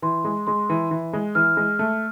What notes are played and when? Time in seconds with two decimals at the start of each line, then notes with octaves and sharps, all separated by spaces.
0.02 E3 C6
0.25 G#3
0.47 G#3 C6
0.70 E3
0.91 E3
1.13 G#3
1.35 E3 F6
1.57 G#3
1.79 A3